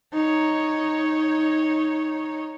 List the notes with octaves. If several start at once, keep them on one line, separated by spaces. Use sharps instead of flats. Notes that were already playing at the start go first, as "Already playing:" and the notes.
D#4 C#5